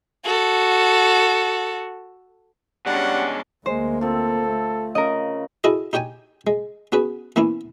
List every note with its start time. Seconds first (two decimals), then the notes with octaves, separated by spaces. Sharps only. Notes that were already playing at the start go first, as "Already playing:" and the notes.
0.25 F#4 A4
2.86 B2 G3 G#3 C#4 D4 F#5
3.66 D2 G#3 A#3 C5
4.01 F3 C4 A4
4.48 A3
4.95 C#3 A#4 D#5
5.64 E4 F#4 G#4 A4 D#5
5.93 D#4 G4 C#5 G5 G#5
6.47 G#3
6.92 B3 C#4 F#4 G#4 B4
7.36 E3 A#3 B3 C#4 E4